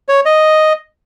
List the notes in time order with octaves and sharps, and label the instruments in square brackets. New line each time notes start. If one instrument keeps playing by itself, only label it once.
[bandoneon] C#5
D#5